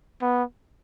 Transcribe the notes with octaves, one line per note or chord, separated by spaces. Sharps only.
B3